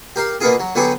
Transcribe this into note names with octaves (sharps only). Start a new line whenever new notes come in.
G4 A#4 F5
B2 A#3 B3 F4 G#4
F#3
D3 F#3 B3 G4 G#4 B4